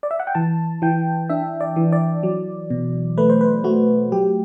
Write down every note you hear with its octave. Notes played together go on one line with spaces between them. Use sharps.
D5
E5
F#5
G5
E3 A5
E3 G5
D4 E5
D5
E3
D5
F#3
B2
A3 B4
C5
B4
A3 F#4
F#3 G4